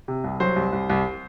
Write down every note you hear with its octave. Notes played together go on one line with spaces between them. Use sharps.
C3
C2
F#3 C5
C2
C2
C2